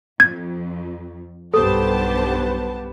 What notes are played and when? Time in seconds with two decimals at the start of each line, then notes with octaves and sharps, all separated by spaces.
0.20 F2 G#6
1.54 B1 G2 B3 G4 A4 C5 A5